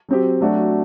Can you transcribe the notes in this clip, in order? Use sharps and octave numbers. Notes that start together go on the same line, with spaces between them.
F#3 C4 G4
F#3 A3 D4 F#4